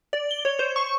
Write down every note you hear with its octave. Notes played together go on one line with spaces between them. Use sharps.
D5
G7
C#5
C5
C#6